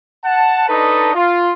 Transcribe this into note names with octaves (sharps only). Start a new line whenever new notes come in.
F#5 A5
D4 D#4 A4 B4 C#5 D#5
F4